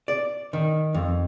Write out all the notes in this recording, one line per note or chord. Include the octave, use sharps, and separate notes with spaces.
D5
D#3
F2